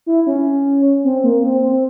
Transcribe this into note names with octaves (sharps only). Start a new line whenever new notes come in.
E4
C#4
C4
A#3
C4
C4